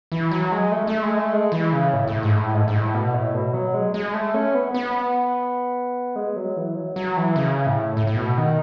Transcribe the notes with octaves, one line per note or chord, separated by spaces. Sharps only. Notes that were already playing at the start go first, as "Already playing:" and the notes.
E3
F#3
G#3
A3
A3
G#3
A3
G#3
E3
C#3
A2
A2
G#2
A2
G#2
G#2
A2
B2
A2
B2
F#3
G#3
G#3
A3
C#4
B3
B3
G#3
F#3
E3
F#3
F#3
E3
C#3
A2
A2
A2
B2
D#3